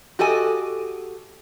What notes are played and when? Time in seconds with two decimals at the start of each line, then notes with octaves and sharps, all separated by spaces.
0.19 F#4 G4 A4 D#5 G#5